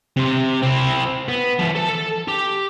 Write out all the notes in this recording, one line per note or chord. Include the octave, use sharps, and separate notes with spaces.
C3 C5
C4 E4
B3
E3 F3
A4 A5
G4